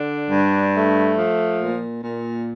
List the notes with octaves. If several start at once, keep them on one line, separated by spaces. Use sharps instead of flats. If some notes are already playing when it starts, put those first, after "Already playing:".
Already playing: D3 D4
G2
A3
F3
A#2
A#2